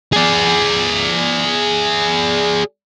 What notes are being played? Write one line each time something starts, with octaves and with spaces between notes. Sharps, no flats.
G#4 D5